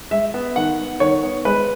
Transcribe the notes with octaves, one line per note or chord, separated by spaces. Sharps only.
G#3 E5
B3
D#3 F#5
B3
D#3 C#5
B3
G#3 B4